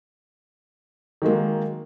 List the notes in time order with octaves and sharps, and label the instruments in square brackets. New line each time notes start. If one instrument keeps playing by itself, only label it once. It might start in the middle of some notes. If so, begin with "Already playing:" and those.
[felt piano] D#3 F#3 G#3 A#3